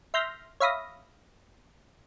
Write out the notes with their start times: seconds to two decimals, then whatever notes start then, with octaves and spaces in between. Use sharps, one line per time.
0.14 E5 C6 F6 G6 A#6 B6
0.60 C#5 E5 F5 B5 D#6 A#6